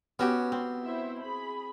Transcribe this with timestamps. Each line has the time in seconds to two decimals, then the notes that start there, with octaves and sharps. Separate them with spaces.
0.19 B3 C#4 F#4 G4
0.52 C4
0.84 E4 C5 E5
1.21 G#4 B5